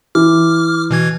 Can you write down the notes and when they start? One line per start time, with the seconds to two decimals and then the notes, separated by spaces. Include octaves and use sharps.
0.15 E3 D6 F6
0.91 B2 E3 G#6